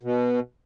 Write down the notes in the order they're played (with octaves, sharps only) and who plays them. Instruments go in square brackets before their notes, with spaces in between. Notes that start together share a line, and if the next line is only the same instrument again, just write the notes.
[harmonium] B2